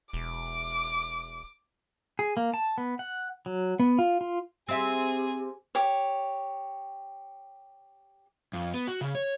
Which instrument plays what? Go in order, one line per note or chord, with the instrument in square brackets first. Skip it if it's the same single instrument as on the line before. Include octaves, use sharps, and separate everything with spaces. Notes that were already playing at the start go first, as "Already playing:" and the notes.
[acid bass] E1 [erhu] D6
[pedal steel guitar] G#4
A#3
A5
B3
F#5
F#3
B3
F4
F4
[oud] C4 E5 [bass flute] G4 [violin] G#4
[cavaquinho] G4 C#5
[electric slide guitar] F2
B3
F#4
C#3
C#5